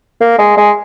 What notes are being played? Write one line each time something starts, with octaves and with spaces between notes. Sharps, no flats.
A#3
G#3
G#3